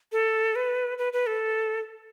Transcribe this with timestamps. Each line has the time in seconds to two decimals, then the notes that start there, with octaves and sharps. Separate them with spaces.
0.12 A4
0.55 B4
0.98 B4
1.13 B4
1.27 A4